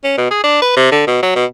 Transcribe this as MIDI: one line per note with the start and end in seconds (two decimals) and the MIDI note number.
0.04 0.15 61
0.18 0.29 47
0.31 0.43 68
0.44 0.59 62
0.62 0.72 71
0.77 0.91 48
0.92 1.05 50
1.07 1.19 47
1.23 1.32 54
1.36 1.45 47